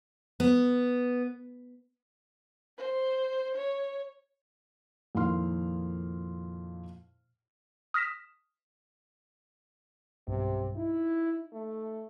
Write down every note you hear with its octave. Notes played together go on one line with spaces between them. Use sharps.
B3
C5
C#5
F2 A#2 D#3 E4 C6 F6
D#6 F6 A#6 B6 E7
B1 G2 C3
D#4 E4
A3